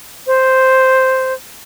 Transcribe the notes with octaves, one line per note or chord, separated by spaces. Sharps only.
C5